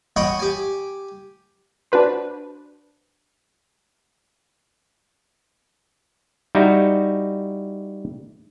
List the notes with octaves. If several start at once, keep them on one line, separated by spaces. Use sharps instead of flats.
C#5 D#5 F#5 G5 B5
G4 G#5
D4 F#4 B4 C5
G3 D#4 E4 F#4